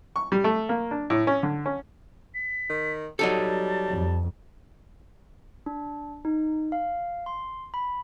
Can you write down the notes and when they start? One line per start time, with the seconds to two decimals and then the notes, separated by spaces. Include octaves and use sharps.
0.16 C#6
0.32 G3
0.44 A3
0.69 A#3
0.91 D4
1.10 A2
1.27 C#4
1.43 D3
1.66 C#4
2.35 B6
2.69 D#3
3.19 F#3 G3 D#4 A4 A5
3.89 F2
5.66 D4
6.25 D#4
6.72 F5
7.26 C6
7.74 B5